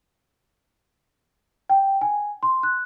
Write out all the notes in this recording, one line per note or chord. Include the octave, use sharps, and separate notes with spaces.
G5
G#5
C6
F#6